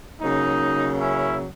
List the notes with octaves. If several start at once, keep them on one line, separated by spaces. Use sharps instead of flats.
C#3 F#3 A#3 D#4
C#4 E4